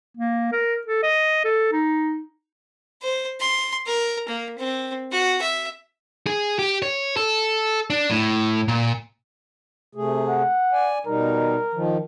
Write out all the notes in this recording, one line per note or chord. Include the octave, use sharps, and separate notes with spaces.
A#3
A#4
A4
D#5
A4
D#4
C5
C6
A#4
A#3
C4
F#4
E5
G#4
G4
C#5
A4
D4
A2
A#2
C3 A3 G#4
F#5
D5 G#5
B2 G3 D#4 A#4
D#3 F3